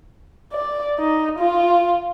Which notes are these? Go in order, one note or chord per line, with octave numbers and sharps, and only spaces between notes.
D5
D#4
F4